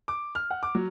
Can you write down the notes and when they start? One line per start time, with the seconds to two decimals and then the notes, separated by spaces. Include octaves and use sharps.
0.08 D6
0.35 F6
0.50 F#5
0.63 D6
0.75 F#3